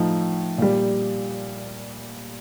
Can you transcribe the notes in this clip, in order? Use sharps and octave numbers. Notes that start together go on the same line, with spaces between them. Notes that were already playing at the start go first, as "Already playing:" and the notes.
Already playing: A2 F3 D#4
A#2 G3